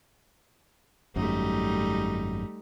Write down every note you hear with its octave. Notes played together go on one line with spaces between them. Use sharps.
G#1 F#2 G3 A3 D#4